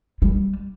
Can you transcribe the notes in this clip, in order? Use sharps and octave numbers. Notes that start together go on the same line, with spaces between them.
G3